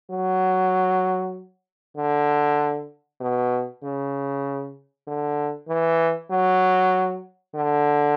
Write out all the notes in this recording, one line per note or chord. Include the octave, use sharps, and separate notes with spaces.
F#3
D3
B2
C#3
D3
E3
F#3
D3